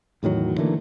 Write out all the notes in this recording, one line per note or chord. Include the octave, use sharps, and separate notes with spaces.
E2 A2 D#3 F#3
D3 E3 A3 A#3